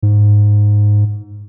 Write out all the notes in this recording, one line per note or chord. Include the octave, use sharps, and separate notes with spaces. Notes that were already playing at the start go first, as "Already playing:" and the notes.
G#2